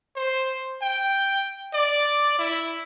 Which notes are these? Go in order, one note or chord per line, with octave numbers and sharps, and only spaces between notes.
C5
G5
D5
E4